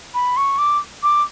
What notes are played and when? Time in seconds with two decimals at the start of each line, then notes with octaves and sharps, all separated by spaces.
0.14 B5
0.37 C#6
0.58 D6
1.03 D6